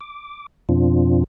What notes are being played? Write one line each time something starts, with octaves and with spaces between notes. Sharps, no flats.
D6
F2 B2 F3 C4 D4 F4